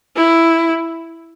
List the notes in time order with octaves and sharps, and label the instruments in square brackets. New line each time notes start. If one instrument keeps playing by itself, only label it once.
[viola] E4